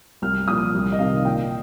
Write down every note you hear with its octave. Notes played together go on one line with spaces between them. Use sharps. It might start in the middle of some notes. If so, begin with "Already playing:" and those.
C2 F6
A#2 F3 D#6
C2
D#5
C3 D#3 F5
A#2 G5